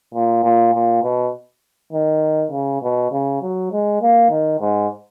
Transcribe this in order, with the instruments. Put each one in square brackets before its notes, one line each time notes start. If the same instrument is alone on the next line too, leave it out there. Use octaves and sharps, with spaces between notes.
[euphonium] A#2
A#2
A#2
B2
D#3
C#3
B2
C#3
F#3
G#3
A#3
D#3
G#2